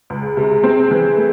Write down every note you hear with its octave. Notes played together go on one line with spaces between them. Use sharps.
C#2
G#4
C3
C4
E3
A3